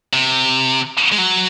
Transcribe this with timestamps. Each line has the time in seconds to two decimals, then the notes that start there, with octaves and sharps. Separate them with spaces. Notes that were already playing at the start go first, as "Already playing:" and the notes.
0.13 C3
1.12 G#3
1.18 F#3